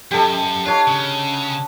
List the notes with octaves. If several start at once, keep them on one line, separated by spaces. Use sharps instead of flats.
F#2 G4 A4 D#5
D4 F4 C#5 D#5
C#3